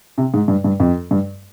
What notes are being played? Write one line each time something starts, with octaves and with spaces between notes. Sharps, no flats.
C3
G#2
G2
G2
F2
G2